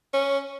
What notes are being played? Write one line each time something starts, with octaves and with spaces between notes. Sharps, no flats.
C#4